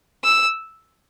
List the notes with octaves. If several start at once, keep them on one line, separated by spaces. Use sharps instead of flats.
E6